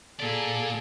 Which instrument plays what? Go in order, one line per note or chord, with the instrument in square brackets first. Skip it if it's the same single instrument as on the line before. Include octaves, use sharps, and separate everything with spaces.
[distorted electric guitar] A#2 D5 [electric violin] G#4 A4